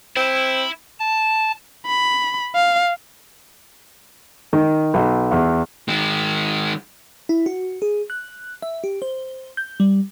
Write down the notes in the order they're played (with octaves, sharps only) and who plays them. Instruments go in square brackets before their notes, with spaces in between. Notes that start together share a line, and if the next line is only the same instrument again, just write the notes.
[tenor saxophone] C4 [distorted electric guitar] E4
[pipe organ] A5
[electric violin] B5
F5
[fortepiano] D#3
B1
E2
[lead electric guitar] D#3 G#3
[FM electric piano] E4
F#4
G#4
F#6
E5
G4
C5
G6
G3